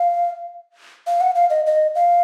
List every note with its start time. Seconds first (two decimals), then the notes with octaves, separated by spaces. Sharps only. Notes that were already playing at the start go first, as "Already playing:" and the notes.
Already playing: F5
1.07 F5
1.21 F#5
1.35 F5
1.50 D#5
1.66 D#5
1.95 F5